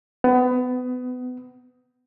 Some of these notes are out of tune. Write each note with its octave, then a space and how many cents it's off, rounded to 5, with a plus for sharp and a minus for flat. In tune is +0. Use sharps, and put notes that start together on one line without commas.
B3 +25